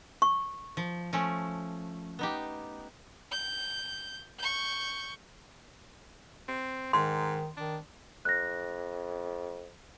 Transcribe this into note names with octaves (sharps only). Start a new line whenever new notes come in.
C#6
F3
F3 A3 C#4
B3 D#4 G4
G6
C#6 G6
C4
G#2 D#3 C6
D#3 D4
F2 F#6 A#6